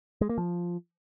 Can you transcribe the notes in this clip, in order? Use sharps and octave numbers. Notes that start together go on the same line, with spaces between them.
G#3
A#3
F3